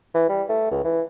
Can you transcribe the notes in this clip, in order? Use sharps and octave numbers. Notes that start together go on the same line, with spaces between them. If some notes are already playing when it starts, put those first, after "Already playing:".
E3
G3
A3
C#2
E3